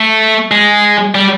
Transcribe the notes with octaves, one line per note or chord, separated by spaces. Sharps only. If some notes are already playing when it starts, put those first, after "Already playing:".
Already playing: A3
G#3
G3